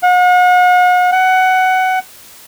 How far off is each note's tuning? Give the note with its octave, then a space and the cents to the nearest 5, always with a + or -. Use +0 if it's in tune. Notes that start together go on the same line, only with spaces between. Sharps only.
F#5 -40
F#5 +15